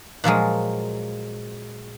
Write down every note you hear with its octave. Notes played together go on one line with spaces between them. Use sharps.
A#2 F3 F#3 G#3